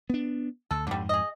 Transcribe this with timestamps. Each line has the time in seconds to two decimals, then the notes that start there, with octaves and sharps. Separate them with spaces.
0.10 B3 D4
0.71 D2 A4
0.87 F2 G#2 D3 G3
1.09 G#4 D#5